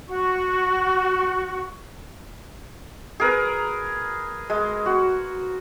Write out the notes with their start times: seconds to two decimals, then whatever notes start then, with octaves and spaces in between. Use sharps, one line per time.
0.08 F#4 C#6
3.20 G#4 A#4 B4
4.50 G#3
4.86 F#4